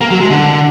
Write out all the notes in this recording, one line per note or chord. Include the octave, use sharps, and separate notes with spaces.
A#3
F#3
G#3
D3